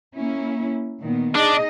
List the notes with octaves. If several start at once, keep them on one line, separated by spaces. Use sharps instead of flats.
A#3 C#4 E4
A#2 D#3 B3
D4 D#4 G#4 D#5